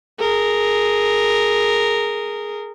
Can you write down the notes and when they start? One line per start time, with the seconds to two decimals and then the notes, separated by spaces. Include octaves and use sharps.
0.19 G#4 A#4